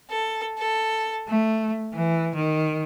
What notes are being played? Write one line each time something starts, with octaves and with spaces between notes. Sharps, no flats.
A4
A4
A3
E3
D#3